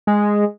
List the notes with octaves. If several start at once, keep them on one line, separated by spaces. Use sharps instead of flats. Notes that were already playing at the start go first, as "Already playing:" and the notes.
G#3